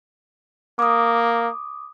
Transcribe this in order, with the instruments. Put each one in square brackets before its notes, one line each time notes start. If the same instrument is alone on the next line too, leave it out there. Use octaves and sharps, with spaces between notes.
[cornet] A#3 [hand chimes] D6 D#6